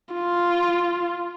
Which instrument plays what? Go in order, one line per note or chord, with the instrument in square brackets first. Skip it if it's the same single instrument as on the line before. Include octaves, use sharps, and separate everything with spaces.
[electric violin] F4